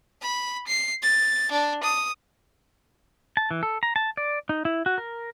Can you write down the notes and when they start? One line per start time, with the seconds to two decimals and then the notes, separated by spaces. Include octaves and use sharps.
0.21 B5
0.67 C7
1.03 A6
1.52 D4
1.84 D#6
3.37 A5
3.51 E3
3.63 A4
3.83 A#5
3.96 A5
4.17 D5
4.49 D#4
4.65 E4
4.86 F#4
4.98 A#4